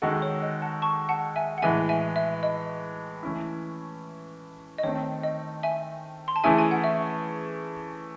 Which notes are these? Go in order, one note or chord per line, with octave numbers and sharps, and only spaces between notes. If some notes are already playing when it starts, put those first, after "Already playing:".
D#3 G#3 D#4 F#4 A4 F#5
C#5
D#5
F#5 A5
A5 C#6
F#5 A5
E5 G#5
F#5
A2 E3 G#3 E5 G#5
E5 G#5
E5
D#5
E3 A3 C#4 E4
D#5
D#3 A3 C4 C#5
D#5
E5 G#5
C6
A5
E3 A3 C#4 E4 G#4 E5 G#5
G#5
F#5
E5